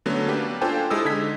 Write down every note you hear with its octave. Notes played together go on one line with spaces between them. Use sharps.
D3 F#3 A3 B3 C#4
A#3 D4 G4 B4
D4 F4 A4 C5 G5 G#5
G#3 E4 G4 A4 D#6 E6
D3 D#4 G#6 B6